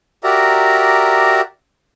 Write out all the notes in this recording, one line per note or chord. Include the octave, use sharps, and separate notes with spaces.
F#4 G4 A#4 D5 E5 A#5